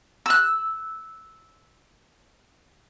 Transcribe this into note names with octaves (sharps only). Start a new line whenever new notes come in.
E6 F#6